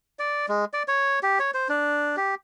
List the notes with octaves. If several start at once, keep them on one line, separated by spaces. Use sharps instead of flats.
D5
G#3
D5
C#5
G4
C#5
C5
D4
G4